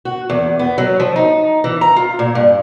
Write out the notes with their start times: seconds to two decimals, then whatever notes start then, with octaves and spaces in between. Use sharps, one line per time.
0.05 F#4
0.30 E2
0.59 B3
0.78 F#3
1.00 F3
1.16 D#4
1.64 E3
1.81 A#5
1.96 F4
2.19 A#2
2.35 G2